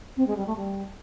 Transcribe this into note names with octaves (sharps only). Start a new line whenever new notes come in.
C4
G#3
G3
A3
G3